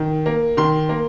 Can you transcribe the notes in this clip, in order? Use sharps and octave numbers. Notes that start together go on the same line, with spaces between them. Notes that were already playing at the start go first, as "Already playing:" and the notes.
Already playing: D#3
A#3
D#3 C6
A#3